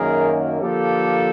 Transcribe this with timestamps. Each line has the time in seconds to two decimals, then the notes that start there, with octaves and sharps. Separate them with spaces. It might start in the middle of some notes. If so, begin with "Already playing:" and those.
Already playing: F#2 D#3 F#3 A#3 G#4 A#4
0.61 D3 F3 A#3 G4 A4